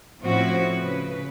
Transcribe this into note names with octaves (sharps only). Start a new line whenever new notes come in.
A2 F3 C4 C#4 E4 F#4
C#3 B4